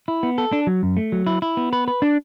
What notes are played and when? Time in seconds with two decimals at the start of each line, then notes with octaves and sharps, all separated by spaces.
0.08 E4
0.23 B3
0.38 A4
0.53 D4
0.67 F#3
0.83 F#2
0.97 A3
1.12 F#3
1.27 E4
1.42 E4
1.57 B3
1.73 B4
1.88 B4
2.02 D4